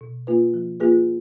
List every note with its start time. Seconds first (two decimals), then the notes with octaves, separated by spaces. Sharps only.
0.01 B2
0.27 A#3 F4 B4
0.54 F3
0.80 A#3 F4 G#4 B4